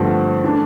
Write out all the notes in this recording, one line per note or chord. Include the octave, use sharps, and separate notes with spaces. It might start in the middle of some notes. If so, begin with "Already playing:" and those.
Already playing: G2 D3 F3 A3 C4
E3 A3 D4